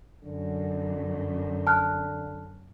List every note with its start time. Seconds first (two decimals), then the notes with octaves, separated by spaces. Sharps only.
0.25 F#2 D3
1.67 A5 F6 F#6